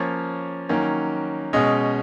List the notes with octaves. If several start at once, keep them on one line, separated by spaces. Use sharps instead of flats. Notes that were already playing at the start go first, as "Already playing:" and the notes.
Already playing: F3 A#3 C#4 C#5
D#3 F#3 A#3 C#4
B2 G#3 C#4 D#5